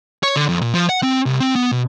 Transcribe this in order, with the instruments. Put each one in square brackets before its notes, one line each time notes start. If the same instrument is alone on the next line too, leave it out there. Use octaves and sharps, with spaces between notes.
[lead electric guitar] C#5
D3
F2
A#2
F3
F#5
C4
C2
C4
B3
B2